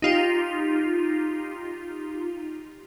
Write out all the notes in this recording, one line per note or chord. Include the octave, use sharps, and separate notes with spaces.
D#4 F4 G4